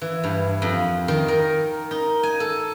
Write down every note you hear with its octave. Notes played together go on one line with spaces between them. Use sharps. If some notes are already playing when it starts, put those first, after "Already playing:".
E3
G2
F2
D#3
A#4
D#4
G#5
A4